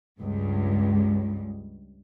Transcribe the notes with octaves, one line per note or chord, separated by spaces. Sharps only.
C#2 G2